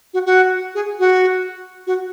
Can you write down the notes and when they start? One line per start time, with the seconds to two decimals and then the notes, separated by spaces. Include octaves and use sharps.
0.14 F#4
0.26 F#4
0.75 G#4
1.00 F#4
1.87 F#4